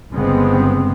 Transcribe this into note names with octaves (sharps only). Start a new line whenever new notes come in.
G1 C#3 G#3 B3 C4